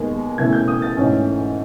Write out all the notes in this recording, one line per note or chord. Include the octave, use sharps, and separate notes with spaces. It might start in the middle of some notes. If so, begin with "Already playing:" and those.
Already playing: D#2 D#3 G#3 B3
E1 E2 C#3 E3 A3 G#6
G6
D#6
A6
G#2 E3 A3 C#4